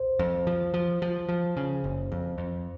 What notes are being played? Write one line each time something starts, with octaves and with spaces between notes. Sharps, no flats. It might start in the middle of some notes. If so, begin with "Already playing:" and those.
Already playing: C5
F2
F3
F3
F3
F3
C#3
F#1
F2
F2